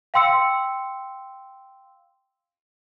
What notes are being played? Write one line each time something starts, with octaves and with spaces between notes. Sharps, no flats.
F5 G5 C6 E6 C#7